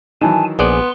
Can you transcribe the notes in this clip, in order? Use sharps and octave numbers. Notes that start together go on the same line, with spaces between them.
D#3 E3 F#3 G#5 A5
A#1 B3 G#4 D5 C6